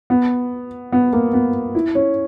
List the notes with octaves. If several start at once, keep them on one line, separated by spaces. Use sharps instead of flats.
B3
B3
A#3
B3
E4
C#4